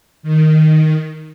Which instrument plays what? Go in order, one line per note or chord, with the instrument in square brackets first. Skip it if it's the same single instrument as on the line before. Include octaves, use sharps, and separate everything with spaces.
[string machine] D#3